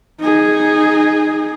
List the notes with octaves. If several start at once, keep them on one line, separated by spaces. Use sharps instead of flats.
D#4 G#4